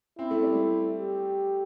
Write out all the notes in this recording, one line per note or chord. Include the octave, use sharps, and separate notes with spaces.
C4 E4
A3
G3
A3
G4